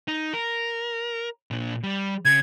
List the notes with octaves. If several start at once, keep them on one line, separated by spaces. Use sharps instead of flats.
D#4
A#4
A#2 D4
G3
C#3 G#6